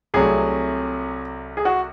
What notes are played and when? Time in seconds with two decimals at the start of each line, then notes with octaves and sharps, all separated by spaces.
0.14 C2 C3 F#3 A3 G#4
1.57 G#4
1.65 F#4